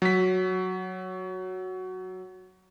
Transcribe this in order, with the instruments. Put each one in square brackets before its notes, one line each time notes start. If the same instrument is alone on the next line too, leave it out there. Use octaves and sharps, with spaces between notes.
[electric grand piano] F#3 B6